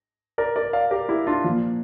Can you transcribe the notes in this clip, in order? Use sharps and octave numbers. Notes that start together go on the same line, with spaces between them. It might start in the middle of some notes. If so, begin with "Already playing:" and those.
A#4 D5
A#4 D5
D5 F5
G4 A#4
E4 G4
D4 F4
A#2 F3